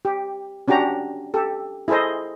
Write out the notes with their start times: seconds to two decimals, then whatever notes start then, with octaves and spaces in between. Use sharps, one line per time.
0.05 G4
0.68 C#4 D4 F#4 G4 A#5
1.34 G4 A4
1.88 E4 G#4 A4 C5 D#5